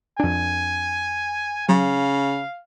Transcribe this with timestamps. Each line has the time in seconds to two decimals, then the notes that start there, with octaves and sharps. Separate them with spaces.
0.20 F2 D4 G#5
1.69 C#3 F#3 F5